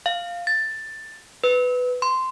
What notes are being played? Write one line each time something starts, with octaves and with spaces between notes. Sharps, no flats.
F5
A6
B4
C6